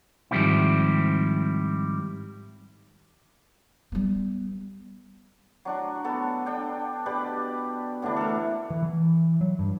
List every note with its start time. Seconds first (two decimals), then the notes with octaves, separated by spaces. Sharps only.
0.31 G#2 D#3 F3 G3 C4 E4
3.92 G3 B3
5.65 F#3 D4 F#4
6.04 B3 A4
6.46 D4 G5
7.06 B2 G4 B4 D5
8.02 A2 D3 E3 D4
8.16 A4 A#4
8.70 E3
8.83 E3
9.41 F#3
9.59 G2